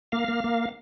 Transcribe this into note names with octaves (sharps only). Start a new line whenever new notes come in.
A#3 F5
A#3
A#3